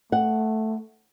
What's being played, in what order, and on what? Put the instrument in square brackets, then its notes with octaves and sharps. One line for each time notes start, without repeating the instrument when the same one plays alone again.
[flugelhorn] A3 [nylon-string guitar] F#5